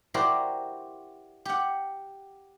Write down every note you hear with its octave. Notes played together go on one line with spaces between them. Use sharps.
E4 F#4 G4 A#4 C5 D5
G4 F#5